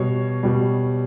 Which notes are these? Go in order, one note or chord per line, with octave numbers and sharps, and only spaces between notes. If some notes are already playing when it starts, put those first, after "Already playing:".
Already playing: B2 G3 C#5
B2 G3